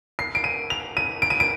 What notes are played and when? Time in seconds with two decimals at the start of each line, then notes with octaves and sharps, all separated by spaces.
0.19 C7
0.35 D7
0.44 D#7
0.70 F7
0.97 D#7
1.22 D7
1.30 D#7
1.40 D7